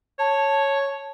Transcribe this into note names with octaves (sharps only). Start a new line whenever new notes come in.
C#5 A5